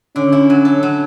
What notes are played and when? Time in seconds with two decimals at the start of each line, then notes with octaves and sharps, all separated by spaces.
0.16 D3 C#4
0.32 E4
0.50 F#3
0.65 A4
0.83 F#3